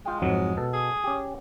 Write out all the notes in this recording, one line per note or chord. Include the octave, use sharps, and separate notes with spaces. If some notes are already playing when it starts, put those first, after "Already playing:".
G#3 F4 G5
F2 G#2 F#3
B2 A4
G#4
C#4 G4